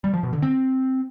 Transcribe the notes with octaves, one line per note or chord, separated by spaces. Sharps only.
G3
F3
B2
D3
C4